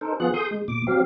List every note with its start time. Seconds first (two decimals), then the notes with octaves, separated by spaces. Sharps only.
0.01 D#4 A4 A#4 C5
0.20 F3 B3 F4 G#4 F#5 F#6
0.34 G#4 A4 C6 D#6 G6
0.51 G#3
0.68 A#2 D6
0.87 F#3 C4 G4 F5